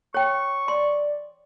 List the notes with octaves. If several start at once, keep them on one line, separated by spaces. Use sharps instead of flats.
C#5 G5 C#6
D5 C6